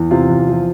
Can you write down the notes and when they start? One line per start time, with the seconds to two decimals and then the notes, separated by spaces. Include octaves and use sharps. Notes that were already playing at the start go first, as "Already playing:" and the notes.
Already playing: E2
0.11 C3 F4
0.29 E2
0.48 F3